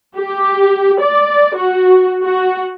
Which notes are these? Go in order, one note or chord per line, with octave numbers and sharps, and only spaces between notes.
G4
D5
F#4
F#4